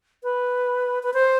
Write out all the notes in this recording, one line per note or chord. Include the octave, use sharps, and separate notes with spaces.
B4
B4
C5